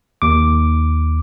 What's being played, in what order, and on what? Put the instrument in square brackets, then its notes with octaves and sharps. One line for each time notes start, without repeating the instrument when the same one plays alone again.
[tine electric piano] D#2 D6